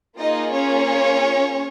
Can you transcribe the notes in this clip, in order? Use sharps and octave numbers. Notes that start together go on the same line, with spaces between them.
A#3 D#4 F4 G#4 D#5
C#4 C#5